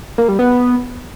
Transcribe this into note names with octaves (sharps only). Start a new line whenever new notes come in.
A#3
G3
B3